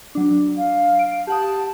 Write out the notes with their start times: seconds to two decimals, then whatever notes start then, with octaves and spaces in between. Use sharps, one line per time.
0.15 F#3 D4
0.57 F5
0.99 D7
1.27 G4 F#5 A5 D#6